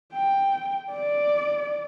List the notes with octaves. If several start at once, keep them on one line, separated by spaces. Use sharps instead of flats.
G5
D5